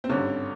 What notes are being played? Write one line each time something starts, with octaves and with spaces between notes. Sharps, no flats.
C4
G#1 G2 D3 C#4